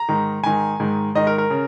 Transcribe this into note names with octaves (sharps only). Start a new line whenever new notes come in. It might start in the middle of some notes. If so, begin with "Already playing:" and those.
Already playing: A#5
G#2 D#3
G#2 D#3 G#5
G#2 D#3
G#2 D#3 D#5
A#4
A#4
C#3